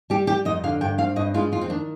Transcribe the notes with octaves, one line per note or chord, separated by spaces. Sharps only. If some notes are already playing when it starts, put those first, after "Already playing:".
G3 G4
G3 G4
F2 D#5
D3 F5
G2 G5
C4 F5
G2 D#5
G#3 F4
F2 F4
C4
D#3 D4